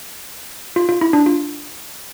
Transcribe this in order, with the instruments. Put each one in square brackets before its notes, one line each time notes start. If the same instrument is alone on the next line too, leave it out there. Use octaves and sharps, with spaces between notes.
[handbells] F4
F4
E4
D4
F4